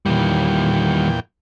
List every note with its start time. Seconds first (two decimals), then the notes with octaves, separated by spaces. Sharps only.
0.06 E2 A#2 D#3 G3 G5